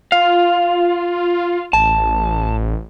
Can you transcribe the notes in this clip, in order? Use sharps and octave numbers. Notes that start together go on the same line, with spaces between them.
F4 F5
A1 A5